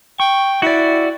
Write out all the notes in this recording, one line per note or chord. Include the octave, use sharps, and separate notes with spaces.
G5 C#6
E4 F#4 D5